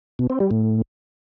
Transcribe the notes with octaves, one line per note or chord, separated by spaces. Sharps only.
B2
C4
G3
A2